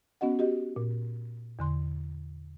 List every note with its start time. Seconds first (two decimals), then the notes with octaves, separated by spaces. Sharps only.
0.21 B3 C#4 F#4 D#5 F#5
0.39 F#4 G4 D#5
0.76 A#2
1.59 E2 D3 C6